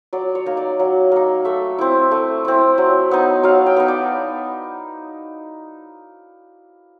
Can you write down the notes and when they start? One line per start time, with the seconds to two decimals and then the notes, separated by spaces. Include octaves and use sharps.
0.13 F#3 D5
0.35 C#5
0.46 A#3 D#4
0.57 D5
0.79 F#3
1.12 A#3 D#4
1.45 A3 E5
1.78 C4 E4
2.11 A3
2.45 C4 E4
2.78 F#3
3.11 B3 D#4
3.43 F#3 F5
3.66 G5
3.76 B3 D#4
3.88 D5